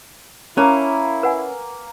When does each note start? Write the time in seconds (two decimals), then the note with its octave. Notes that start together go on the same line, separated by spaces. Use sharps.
0.58 A#3 C#4 E4 C#5 A5 A#5
1.23 B4 F#5 G#5